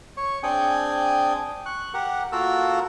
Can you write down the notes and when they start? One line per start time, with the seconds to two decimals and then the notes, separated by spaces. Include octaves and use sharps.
0.17 C#5 C#6
0.43 C4 D4 G#4 G5 G#5
1.66 C#6 F#6
1.94 G4 A#4 F#5
2.32 A#3 F4 F#4 A4 A#4 E6